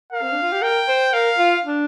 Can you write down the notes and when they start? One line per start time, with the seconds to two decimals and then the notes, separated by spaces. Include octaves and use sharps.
0.12 A#4 F5
0.22 C4
0.33 D4
0.43 F4
0.52 G4
0.62 A#4 G5
0.88 C5
1.13 A#4 F5
1.38 F4
1.64 D4